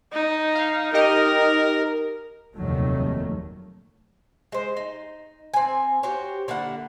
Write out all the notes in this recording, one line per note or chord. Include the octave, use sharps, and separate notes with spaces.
D#4
F5
D#4 G4 A#4 D#5
F1 D#2 A#2 D#3 F#3 A3
G#3 C5
D#4
C4 G#5
F#4 G4 C5 C#5
D3 A#3 E4 F#5